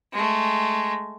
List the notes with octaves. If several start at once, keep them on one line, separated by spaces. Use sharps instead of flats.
G#3 A3